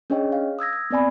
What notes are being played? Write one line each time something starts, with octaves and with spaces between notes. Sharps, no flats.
C#4 D4 G#4 C#5 D#5 G5
F5
D#6 E6 G#6 A#6
G#6
B3 C4 D5 G#5 B5